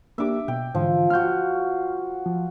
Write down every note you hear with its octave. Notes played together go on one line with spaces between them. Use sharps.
A#3 D4 G4 E5 D6
B2 G5
G#2 D3 E3 F3
F4 F#4 F6 G6
F3